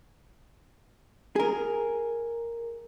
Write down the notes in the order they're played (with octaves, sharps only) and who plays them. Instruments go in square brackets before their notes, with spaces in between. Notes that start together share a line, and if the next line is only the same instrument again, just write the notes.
[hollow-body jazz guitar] G#4 A#4